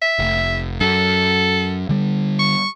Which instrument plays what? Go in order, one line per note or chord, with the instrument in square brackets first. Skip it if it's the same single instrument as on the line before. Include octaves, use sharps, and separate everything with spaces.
[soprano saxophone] E5
[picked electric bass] F1
[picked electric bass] F#2 [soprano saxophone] A4
[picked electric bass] D3 G3
[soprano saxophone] C#6